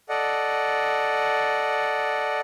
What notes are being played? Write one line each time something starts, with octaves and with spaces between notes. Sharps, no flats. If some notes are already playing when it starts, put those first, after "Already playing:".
A4 D5 D#5 F#5